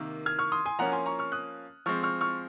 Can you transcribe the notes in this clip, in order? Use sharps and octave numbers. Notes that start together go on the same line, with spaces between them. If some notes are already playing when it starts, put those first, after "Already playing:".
Already playing: C3 D#3 A#3
F6 G#6
C#6 F6
C6 D#6
G#5 C6
F3 A#3 C#4 F#5 A#5
G#5 C6
A#5 C#6
C#6 F6
D#6 F#6
F3 G#3 C4 C#6 F6
C#6 F6
C#6 F6